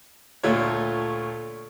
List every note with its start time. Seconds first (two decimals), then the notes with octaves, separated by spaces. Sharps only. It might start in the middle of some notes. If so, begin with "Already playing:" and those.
0.43 D2 A#2 A3 F4 C#5